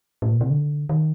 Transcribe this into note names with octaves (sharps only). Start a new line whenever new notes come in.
A2
A#2
C3
D3
D#3